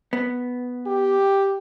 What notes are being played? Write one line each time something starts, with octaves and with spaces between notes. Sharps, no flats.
B3
G4